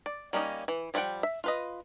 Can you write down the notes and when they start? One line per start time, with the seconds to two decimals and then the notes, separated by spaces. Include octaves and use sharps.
0.06 D5
0.33 G3 A#3 C#4 D#4
0.68 E3
0.94 F3 G3 C#4 F#5 G5
1.23 E5
1.44 F4 B4 D#5